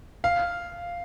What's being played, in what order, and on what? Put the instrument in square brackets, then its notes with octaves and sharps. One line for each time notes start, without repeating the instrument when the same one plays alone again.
[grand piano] F5